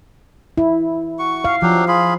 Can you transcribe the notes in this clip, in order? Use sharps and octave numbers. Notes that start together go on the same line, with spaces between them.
E4
F#4 C#6
F5
F3 F#3 D4 G4
F4 G#4 B5